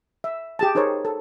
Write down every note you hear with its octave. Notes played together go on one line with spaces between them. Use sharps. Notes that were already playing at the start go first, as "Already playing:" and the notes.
E5
G4 G#4 A5
D#4 G#4 A#4 C5 C#5
A4